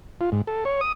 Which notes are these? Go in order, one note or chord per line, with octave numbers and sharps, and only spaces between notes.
F4
G#2
A4
C#5
D#6